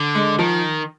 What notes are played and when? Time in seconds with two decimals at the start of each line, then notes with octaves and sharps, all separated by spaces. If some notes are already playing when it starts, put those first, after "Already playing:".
Already playing: D3
0.15 G#3
0.39 D#3 F3